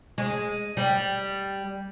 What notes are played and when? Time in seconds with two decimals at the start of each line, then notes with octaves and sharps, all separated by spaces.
0.18 G#3
0.77 G3